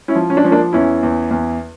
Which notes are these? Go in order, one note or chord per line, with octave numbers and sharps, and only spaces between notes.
C#4 E4
F3
C#4
D4
F3 C#4
A#3 D4
E2 C#4 E4
E2
E2